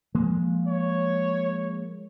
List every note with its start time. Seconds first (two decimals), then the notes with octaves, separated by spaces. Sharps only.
0.15 F3 G#3 A#3
0.68 C#5